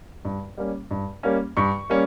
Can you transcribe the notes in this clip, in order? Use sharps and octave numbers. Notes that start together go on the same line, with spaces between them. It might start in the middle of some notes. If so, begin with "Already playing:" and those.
G2
G3 A#3 C#4
G2
G3 A#3 C#4
G2 C#6
G3 A#3 C#4